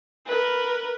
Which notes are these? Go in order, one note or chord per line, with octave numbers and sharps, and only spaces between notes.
A#4 B4